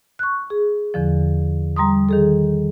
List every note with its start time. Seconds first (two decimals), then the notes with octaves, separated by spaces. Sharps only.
0.19 C#6 F#6
0.50 G#4
0.94 E2 D3 F3
1.76 G3 A#5 C6 D#6
2.09 D#3 G#4 A4